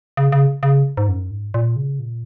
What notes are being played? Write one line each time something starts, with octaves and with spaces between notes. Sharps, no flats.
C#3
C#3
C#3
G#2
F#2
G#2
A#2
C#3
A#2